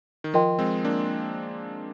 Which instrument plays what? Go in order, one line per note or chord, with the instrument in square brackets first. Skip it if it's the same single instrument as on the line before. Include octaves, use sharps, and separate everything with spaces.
[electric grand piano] D#3
[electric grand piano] F3 [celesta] F4 A#4 D#5 G5 C6
[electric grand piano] G#3 C4
A#3 D4